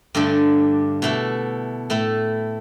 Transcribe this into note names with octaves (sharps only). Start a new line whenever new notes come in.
G2 D3 A3 D4
B2 A3 E4
A2 A3 E4